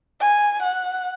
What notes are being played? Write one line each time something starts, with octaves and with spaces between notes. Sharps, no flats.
G#5
F#5